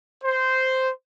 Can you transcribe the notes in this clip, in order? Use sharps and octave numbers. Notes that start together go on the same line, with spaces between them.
C5